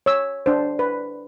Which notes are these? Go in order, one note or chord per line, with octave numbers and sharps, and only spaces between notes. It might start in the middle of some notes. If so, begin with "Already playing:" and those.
C#5 E6
D4 C5
B4